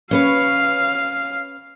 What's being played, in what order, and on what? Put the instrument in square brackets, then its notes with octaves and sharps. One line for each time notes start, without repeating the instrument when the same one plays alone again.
[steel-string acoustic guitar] C#4 B4 C#5 [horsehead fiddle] F5